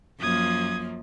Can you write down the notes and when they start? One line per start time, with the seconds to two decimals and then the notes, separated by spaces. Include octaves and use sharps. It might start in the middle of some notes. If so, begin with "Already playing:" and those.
0.20 F#2 F3 A#3 D#6 G#6